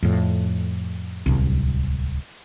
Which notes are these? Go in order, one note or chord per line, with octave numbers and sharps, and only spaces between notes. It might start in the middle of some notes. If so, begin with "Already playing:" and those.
F2 A2
D1 C2